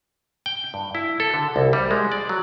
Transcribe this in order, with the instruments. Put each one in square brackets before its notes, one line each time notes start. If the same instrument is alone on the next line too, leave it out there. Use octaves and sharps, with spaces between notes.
[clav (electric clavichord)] G5
G2
E4
A4
D3
C2
G3
G#3
D5
F#3